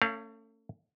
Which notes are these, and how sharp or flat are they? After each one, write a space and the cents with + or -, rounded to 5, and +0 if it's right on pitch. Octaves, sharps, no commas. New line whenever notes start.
A3 +35 C#4 +0 F5 +0